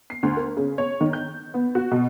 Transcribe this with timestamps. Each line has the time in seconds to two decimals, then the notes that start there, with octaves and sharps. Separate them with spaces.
0.10 C7
0.23 D2
0.37 A#4
0.57 C#3
0.78 C#5
1.01 D#3
1.13 G6
1.54 B3
1.75 F#4
1.91 B2